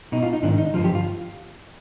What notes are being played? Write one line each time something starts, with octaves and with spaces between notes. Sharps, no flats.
B2 D#4
F4
D#4
G#2 D#3 D4
D#4
G2 D3 F3 F4
G4
F4